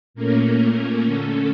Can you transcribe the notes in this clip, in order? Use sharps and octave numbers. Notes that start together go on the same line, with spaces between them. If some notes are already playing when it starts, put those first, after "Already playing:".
A#2 A3 A#3 C#4 A#4
D3 A3 C#4 A4